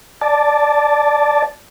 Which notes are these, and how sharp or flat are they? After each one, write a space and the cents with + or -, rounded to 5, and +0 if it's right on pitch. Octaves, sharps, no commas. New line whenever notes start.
D5 +0 A5 +0